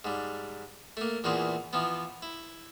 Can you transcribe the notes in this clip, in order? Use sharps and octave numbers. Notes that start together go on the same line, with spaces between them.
G#2 G3
A3 A#3
E2 A#2 E3 C4 G#4
E3 F3 B3
E4